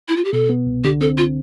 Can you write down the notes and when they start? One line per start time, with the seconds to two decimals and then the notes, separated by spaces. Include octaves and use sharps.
0.08 E4
0.16 F4
0.24 G4
0.33 B2 A4
0.49 B3
0.67 C2
0.84 D3 G4
1.01 C4 A4
1.18 F4